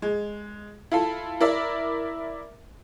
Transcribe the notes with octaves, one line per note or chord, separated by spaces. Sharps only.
G#3
E4 F4 A4
E4 A#4 D5 E5